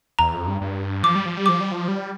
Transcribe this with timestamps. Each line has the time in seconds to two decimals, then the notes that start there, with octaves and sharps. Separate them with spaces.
0.19 E2 A#5
0.33 F2
0.47 G2
0.61 G2
1.03 F3 D6
1.15 G3
1.26 F3
1.37 G3
1.46 F3 D6
1.60 G3
1.72 F3
1.88 G3